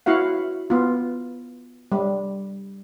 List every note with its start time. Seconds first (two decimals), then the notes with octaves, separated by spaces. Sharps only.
0.06 E4 F#4 F5 F#5
0.70 B3 F4
1.92 G3